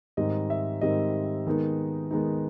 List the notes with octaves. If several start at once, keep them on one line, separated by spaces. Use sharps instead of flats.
G#2 D#3 G3 C4 D#4 D#5
E5
G#2 D#3 G3 C4 D#4 D#5
D#3 G#3 B3 D#4
D#3 G#3 B3 D#4